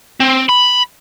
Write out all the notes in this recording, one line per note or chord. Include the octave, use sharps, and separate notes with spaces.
C4
B5